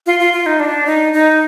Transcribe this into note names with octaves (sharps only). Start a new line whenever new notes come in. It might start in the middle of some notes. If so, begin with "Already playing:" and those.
F4
F4
F4
D#4
D4
D#4
D#4